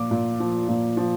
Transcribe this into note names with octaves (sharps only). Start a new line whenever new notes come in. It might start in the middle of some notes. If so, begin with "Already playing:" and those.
Already playing: A#2 F3 D6
A#2
F3
A#2
F3